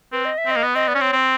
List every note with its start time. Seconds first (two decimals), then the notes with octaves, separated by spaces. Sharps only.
0.12 C4 B4
0.25 D#5
0.38 E5
0.46 C4 D#5
0.56 A#3
0.63 B3
0.75 C4 D#5
0.88 B3 D5
0.95 C#4
1.01 C4 C#5
1.13 C4